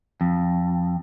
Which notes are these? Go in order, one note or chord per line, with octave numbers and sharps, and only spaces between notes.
F2